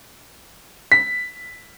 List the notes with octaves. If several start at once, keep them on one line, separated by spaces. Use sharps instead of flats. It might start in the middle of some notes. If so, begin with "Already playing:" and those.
B6